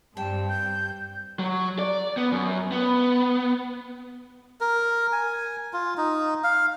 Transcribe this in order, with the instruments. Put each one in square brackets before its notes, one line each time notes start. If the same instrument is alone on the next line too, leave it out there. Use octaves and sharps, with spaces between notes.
[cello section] G2 C4 [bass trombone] G3 [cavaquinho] G5 [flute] A5
[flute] G6
[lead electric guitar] F#3
D5
B3
F#2
B3
[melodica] A#4
G#5
F4
D#4
F5